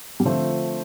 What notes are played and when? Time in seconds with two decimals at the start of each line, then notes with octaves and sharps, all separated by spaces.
0.20 G3
0.25 D3 F3 A3 C4 F4